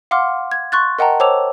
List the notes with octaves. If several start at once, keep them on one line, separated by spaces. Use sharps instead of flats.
F5 F#5 C6 D6 F6
G#6
C6 C#6 F#6 A6
A#4 D#5 F#5 G5 A5 A#5
C5 C#5 A5 D6 E6 F7